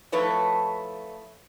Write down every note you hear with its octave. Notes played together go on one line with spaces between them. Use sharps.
F3 A3 E4 B4 C#5